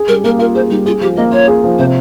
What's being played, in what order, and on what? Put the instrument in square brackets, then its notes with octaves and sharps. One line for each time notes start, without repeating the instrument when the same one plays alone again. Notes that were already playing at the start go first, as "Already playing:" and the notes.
Already playing: [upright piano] G#4
[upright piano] G3 [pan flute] A#4
[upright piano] A#3 [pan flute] A#4
[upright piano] F4 [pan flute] A#4
[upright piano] G#4 [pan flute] C5
[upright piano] G3 [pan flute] D#4
[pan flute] F4 [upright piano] G#4
[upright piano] F3 [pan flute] G4
[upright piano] A#3 [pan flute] D#5
[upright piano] F4 [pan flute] C#5
[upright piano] G#4
F3
[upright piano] C3 [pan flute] C5